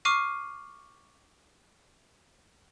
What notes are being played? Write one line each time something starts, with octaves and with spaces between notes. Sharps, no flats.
C#6 D6 F6 C7 D#7